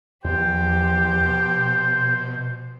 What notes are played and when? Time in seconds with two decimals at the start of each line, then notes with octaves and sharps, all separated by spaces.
0.25 E2 F3 G4 C5
1.21 B2